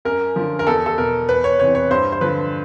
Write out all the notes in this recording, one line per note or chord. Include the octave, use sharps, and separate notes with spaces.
F#2 A#4
D3 F3
A#4
E2 A4
A4
B2 A#4
E2 B4
C#5
C3 E3 C#5
C#5
G2 C5
C5
D3 F3 B4